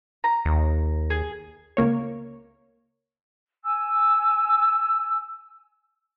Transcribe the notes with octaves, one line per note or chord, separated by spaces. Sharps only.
A#5
D#2
G#4
C#2 A#3 C#5
G#5 E6